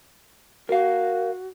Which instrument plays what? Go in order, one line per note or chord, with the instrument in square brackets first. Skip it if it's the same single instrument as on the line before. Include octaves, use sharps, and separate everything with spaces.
[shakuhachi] F#4 [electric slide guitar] A#4 F5